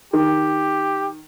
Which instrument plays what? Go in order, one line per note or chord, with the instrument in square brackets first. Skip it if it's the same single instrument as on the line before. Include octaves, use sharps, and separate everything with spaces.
[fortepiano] D#3 [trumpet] G4